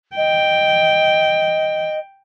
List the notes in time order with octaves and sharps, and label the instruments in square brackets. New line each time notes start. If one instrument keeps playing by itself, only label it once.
[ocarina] D#5 [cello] G5